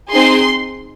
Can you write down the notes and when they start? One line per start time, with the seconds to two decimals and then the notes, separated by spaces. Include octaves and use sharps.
0.10 C4 D#4 G#4 C6